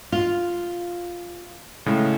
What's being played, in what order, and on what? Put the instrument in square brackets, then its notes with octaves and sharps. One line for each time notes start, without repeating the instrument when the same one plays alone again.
[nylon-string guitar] F4
[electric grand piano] A2 C#3 G#3